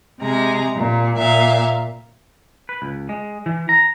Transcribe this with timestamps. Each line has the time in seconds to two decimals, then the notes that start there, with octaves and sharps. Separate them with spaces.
0.19 C3 G#3 A#5
0.75 A#2
1.16 A#2 E5 F5
2.69 B4
2.82 C#2
3.09 G#3
3.46 E3
3.69 A#5